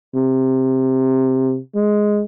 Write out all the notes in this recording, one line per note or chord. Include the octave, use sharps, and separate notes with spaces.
C3
G#3